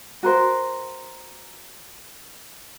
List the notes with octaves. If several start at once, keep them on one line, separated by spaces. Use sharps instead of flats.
F#4 A#4 C5